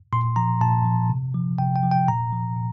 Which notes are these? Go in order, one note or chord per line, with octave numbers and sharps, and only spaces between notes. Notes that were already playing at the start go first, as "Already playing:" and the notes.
A#2 C6
F3 A#5
A#2 A5
F3
C3
F3
C3 G5
G5
F3
G5
A#2 A#5
F3
A#2